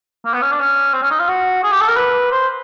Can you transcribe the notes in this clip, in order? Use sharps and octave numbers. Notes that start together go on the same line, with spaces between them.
A#3
B3
C#4
D4
C#4
C4
C#4
D#4
F4
F#4
G#4
G4
A4
A#4
B4
C5